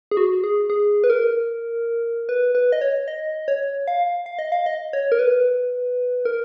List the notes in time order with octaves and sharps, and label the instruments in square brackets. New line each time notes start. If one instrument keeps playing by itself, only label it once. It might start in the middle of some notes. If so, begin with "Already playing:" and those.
[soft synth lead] G#4
F#4
G#4
G#4
B4
A#4
B4
B4
D#5
C#5
D#5
C#5
F5
F5
D#5
F5
D#5
C#5
A#4
B4
A#4